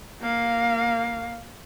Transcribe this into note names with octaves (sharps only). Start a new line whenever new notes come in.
A#3 F5